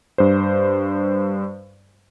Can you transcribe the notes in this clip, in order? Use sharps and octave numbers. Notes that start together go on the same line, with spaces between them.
G2 C5